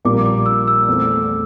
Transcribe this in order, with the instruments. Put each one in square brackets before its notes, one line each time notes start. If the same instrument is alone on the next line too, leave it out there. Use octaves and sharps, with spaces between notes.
[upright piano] A#1 A#2 G3 A#3 [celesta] D6
[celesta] D6
E6
E6
[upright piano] E2 E3 A3 C4